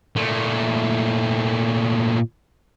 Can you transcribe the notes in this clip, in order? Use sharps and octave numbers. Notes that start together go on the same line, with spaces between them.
A#2 A3